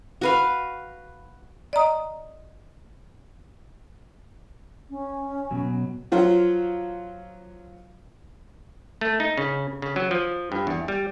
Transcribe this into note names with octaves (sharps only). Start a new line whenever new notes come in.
F#4 B4 F5
D5 D#5 A#5 D#6
C#4
B2 F#3
F3 F#3 F4
A3
D#4
C#3
C#3
F#3
F3
G2
E2
G3